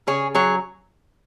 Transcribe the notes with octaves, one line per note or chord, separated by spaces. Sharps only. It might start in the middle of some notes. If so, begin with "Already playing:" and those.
C#3 G#4 C#5
F#3 G#4 C#5